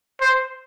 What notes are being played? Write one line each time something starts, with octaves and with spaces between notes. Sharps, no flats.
C5